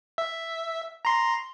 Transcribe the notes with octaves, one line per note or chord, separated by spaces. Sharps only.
E5
A#5 C6